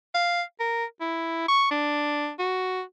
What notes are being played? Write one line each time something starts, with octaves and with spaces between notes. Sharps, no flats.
F5
A#4
E4
C#6
D4
F#4